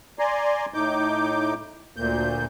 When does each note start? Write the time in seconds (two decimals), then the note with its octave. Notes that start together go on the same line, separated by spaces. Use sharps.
0.19 D5 G#5 A#5 C6
0.74 A2 D#4 D6 G6
1.96 D2 A#2 G6